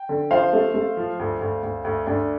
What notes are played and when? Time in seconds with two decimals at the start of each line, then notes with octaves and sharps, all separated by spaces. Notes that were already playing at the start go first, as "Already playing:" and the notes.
Already playing: G5
0.09 D3
0.31 F3 C5 F5
0.53 A3
0.74 A3
0.97 F3
1.19 D2
1.41 D2
1.63 D2
1.84 D2
2.06 D2 D4